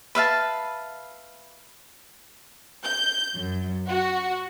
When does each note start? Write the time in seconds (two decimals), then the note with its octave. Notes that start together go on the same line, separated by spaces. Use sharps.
0.15 B4 E5 F5 A5
2.84 G6
3.37 F#2
3.87 F#4